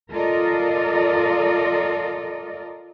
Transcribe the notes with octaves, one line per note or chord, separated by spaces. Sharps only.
F4 A4 A#4 D5 D#5